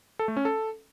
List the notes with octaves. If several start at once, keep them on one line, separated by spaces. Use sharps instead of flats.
A4
A3
C#4
A4